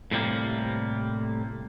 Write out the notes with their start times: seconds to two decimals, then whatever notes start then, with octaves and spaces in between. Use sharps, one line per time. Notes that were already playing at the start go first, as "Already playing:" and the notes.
0.11 A2 C3 G3 A#3